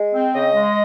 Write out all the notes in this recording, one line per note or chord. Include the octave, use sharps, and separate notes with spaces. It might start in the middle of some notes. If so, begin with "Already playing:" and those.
Already playing: G#3
C4
C#3 D#5
G#3